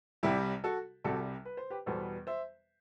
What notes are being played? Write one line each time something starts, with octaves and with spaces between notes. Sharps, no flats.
C2 C3 G3 E4 G4
F#4 A4
C2 C3 G3 F#4 A4
B4
C5
G4 B4
E2 B2 G3 B3 A4 C5
C5 E5